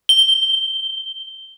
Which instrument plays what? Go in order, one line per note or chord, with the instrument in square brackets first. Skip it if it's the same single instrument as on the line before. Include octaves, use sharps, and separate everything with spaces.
[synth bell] G7